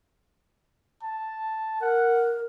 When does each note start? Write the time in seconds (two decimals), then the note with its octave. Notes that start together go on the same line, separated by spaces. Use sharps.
1.03 A5
1.81 A#4 F#5